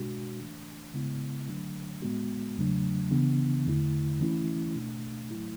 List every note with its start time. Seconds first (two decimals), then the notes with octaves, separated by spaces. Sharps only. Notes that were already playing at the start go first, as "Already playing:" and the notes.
Already playing: B2 G#3 D4 F#4
0.40 E3 A3 D4
0.94 C#3 G#3 B3 E4
1.48 D3 F#3 A3 D4
2.02 A2 G#3 B3 F#4
2.57 E2 C#3 F#3 A3 D4
3.11 C#3 E3 B3 D4
3.66 E2 D3 A3 E4
4.20 E3 A3 C#4 E4
4.75 B2 A3 D4
5.29 A2 F#3 A3 E4